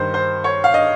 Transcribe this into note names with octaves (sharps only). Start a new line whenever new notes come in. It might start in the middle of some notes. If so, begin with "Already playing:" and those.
Already playing: G2 D#3 C5
C5
C#5
F5
D#5